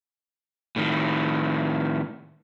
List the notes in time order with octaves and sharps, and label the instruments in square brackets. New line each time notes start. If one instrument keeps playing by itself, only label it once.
[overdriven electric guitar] A2 D#3